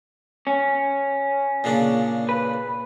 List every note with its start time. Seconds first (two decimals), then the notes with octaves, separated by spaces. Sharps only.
0.47 C#4
1.64 A#2 C#3 D4
2.29 B4